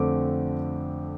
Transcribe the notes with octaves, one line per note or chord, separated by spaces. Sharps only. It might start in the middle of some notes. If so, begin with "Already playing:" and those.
Already playing: F2 D3 A3 C4 D6